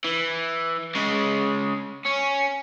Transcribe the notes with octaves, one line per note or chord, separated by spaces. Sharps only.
E3
C#3 G#3
C#4